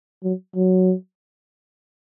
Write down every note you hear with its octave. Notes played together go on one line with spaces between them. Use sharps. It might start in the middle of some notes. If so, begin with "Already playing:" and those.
F#3
F#3